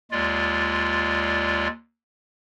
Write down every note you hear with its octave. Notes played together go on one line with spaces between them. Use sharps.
D#2 G#3 F4 D5